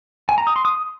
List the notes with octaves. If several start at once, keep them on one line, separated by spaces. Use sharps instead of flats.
G#5
A#5
D#6
C6
D#6